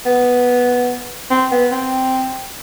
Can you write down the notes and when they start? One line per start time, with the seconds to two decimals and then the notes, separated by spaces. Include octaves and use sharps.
0.06 B3
1.30 C4
1.52 B3
1.72 C4